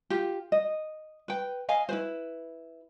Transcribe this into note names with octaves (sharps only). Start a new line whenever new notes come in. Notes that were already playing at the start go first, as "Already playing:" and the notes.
F4 G4
D#5
B4 G5
D#5 F5 G#5
E4 B4 C5